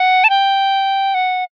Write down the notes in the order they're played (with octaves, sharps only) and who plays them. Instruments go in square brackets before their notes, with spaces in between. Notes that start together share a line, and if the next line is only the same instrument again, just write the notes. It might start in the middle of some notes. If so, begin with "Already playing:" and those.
Already playing: [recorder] F#5
A5
G5
F#5